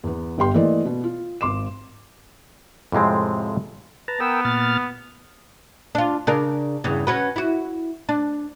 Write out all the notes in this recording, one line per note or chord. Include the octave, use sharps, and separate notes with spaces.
E2 B3
G1 G4 G5 C6
E3 A3 A#3 D5 D#5
B2 B3
F4
G#1 C6 D6 E7
F2 A2 C3 G#3 C4
B4 A5 A#5
B3 A#4 G5 E6
A#2 F6 A6
D4 F4
C#3 D4 A#4
E2 G2 C#3
C#4 F#4 B4
E4 F#4
D4